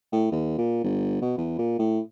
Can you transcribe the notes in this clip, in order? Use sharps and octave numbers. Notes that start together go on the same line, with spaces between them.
A2
D#2
A#2
G1
B2
E2
A#2
A2